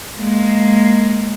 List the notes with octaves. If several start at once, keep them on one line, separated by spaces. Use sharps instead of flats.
G#3 A#3